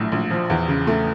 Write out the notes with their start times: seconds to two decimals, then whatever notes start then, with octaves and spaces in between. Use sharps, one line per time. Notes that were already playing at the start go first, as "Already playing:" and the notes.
Already playing: A#1 A2 F#3
0.12 A#1
0.31 F3
0.50 E2
0.68 C#3
0.87 A3